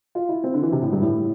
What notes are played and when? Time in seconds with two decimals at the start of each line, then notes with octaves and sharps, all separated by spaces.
0.15 F4
0.29 E4
0.44 C4
0.54 D3
0.63 E3
0.72 C3
0.82 A2
0.92 G2
1.02 A2